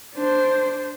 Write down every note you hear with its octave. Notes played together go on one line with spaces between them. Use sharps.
D4 C5